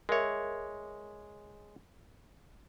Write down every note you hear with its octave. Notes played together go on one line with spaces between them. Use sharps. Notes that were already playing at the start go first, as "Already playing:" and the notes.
G#3 A#4 C#5 E5